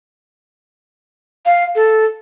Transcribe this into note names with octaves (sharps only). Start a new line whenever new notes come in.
F5
A4